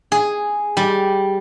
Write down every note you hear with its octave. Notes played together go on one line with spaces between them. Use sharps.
G#4
G3